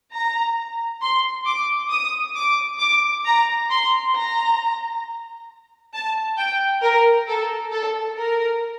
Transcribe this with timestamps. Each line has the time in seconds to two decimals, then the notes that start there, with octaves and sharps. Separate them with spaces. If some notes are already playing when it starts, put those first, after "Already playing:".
0.12 A#5
1.01 C6
1.46 D6
1.90 D#6
2.36 D6
2.79 D6
3.25 A#5
3.70 C6
4.14 A#5
5.93 A5
6.38 G5
6.82 A#4
7.28 A4
7.71 A4
8.17 A#4